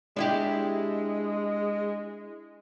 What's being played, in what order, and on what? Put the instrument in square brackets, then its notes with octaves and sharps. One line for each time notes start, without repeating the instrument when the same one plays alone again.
[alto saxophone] G#3 [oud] D4 E4 G4